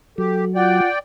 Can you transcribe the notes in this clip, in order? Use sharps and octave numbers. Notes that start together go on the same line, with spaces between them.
F#3 G4 A4
F4 D5 F#5 G5